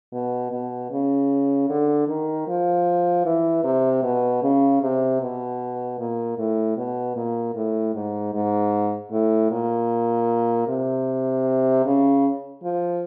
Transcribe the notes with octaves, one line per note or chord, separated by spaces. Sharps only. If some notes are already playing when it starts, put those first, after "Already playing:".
B2
B2
C#3
D3
D#3
F3
E3
C3
B2
C#3
C3
B2
A#2
A2
B2
A#2
A2
G#2
G#2
A2
A#2
C3
C#3
F3